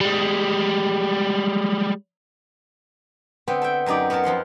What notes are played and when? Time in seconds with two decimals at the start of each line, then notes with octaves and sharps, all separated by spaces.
0.01 G3 G#3
3.48 D3 B3 C4 G5
3.62 A4 E5 G5
3.86 F#2 F#3 D#4 G4 D5
4.10 B3 F#4 A#4 C#5 A5
4.24 F2 F3 F#5 C6